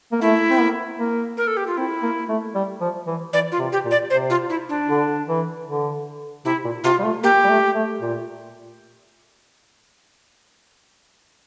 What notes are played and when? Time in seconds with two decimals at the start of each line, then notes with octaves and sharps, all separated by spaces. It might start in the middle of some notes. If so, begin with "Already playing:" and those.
0.12 A#3
0.21 A3 E4
0.50 C4
0.60 A#3
0.99 A#3
1.37 A#4
1.47 A4
1.57 G4
1.67 F4
1.77 C4 E4
2.03 A#3
2.29 A3
2.55 G3
2.81 F3
3.07 E3
3.33 E3 D5
3.52 F4
3.59 C3
3.72 G4
3.85 A#2
3.91 D5
4.10 C3 C5
4.30 F4
4.50 E4
4.69 D4
4.89 D3
5.29 E3
5.67 D3
6.45 C3 E4
6.65 A#2
6.84 C3 F4
6.99 G3
7.04 A3
7.23 A#3 G4
7.44 G3
7.49 A3
7.74 A3
8.01 A#2